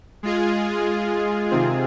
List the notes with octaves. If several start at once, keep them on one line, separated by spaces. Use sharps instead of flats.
G#3 F4 G#4
C3 D#3 C4 F4 G#4